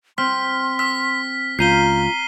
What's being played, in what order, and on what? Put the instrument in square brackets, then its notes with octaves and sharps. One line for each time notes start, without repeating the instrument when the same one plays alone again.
[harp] C4 [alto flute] C6 [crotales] F6 B6
[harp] E6 F6 [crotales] B6
[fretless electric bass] C#2 [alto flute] F4 [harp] A#5 G6 [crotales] C7 D#7 G7